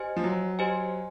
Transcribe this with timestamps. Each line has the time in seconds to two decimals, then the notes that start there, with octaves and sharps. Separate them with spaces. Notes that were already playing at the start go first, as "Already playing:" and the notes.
Already playing: G4 C5 D#5 G#5
0.16 F3
0.24 F#3
0.59 G4 C5 D#5 G#5